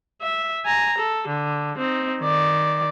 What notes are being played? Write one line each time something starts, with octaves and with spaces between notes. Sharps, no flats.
E5
G#5 A#5
A4
D3
C4 D#4
D#3 D5